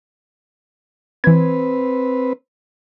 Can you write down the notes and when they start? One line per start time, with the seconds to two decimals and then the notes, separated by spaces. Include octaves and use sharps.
1.24 E3 C4 B4 G#6